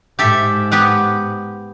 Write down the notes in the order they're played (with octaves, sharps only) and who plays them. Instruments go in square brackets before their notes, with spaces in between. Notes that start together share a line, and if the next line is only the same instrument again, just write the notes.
[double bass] G#2 [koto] G4 A4 E5
[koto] B3 G4 F#5